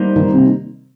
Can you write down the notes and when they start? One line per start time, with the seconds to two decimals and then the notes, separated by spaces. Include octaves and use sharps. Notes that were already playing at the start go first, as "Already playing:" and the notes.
Already playing: G3 A#3 D#4 C5
0.16 D#3
0.32 C3